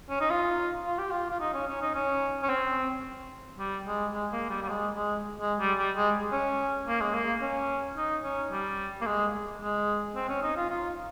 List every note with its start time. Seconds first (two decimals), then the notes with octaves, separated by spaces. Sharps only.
0.10 C#4
0.20 D#4
0.30 F4
0.86 F4
0.99 G4
1.11 F4
1.30 F4
1.40 D#4
1.54 C#4
1.67 C#4
1.82 D#4
1.95 C#4
2.43 C#4
2.49 C4
3.59 G3
3.87 G#3
4.13 G#3
4.32 A#3
4.50 G3
4.62 G3
4.69 G#3
4.96 G#3
5.41 G#3
5.60 G3
5.78 G3
5.96 G#3
6.32 C#4
6.88 A#3
7.01 G#3
7.14 A#3
7.41 C#4
7.97 D#4
8.24 C#4
8.52 G3
9.01 A#3
9.06 G#3
9.62 G#3
10.16 C4
10.29 C#4
10.42 D#4
10.57 F4
10.70 F4